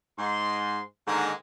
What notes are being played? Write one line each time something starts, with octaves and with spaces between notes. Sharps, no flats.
G#2 C6
G#2 D3 D#3 G#3 A#3